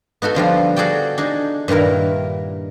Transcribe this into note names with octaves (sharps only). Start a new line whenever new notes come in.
B3 D#4 F#4 A4
D3 F3 G3 F4
F#4 G#4 A4 D5 G5
D4 D#4 G#4
G2 A#2 D#3 E4 A#4